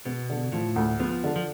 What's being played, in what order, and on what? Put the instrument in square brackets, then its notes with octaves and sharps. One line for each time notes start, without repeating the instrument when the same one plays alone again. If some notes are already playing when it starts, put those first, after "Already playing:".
[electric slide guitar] B2 [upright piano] B3
[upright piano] D3
[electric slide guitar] A2 [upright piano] F3
[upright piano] D2
[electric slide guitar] F3 [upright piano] B3
[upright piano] D3
[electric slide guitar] F3